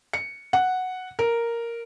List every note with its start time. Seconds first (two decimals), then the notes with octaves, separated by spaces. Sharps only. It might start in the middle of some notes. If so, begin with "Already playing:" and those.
0.13 C#7
0.53 F#5
1.19 A#4